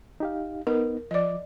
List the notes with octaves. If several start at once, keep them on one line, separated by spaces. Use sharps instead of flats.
D#4 G4 F5
B3 D#4 A#4
F3 D5 D#5 D6